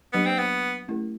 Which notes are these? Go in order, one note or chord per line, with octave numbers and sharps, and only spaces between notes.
F#3 A#3 B3 D4 G4
C4
B3
A3 C#4 E4 G4 A#4